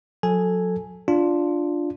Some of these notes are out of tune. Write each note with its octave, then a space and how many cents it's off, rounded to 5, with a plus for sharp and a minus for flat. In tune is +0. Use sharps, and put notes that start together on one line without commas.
F#3 -35 A4 +0 G#5 +0
D4 +0 F4 +0